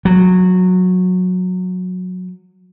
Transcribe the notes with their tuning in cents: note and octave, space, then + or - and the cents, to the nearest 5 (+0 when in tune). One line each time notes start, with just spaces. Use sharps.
F#3 -15